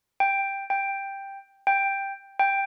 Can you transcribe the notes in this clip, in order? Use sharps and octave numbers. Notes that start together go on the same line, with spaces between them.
G5
G5
G5
G5